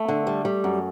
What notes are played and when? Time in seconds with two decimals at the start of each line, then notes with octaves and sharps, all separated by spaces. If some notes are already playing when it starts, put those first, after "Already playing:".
Already playing: A3
0.08 D3
0.27 G3
0.45 G3
0.64 F#2